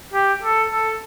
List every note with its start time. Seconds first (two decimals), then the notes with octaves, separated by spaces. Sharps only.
0.13 G4
0.43 A4
0.70 A4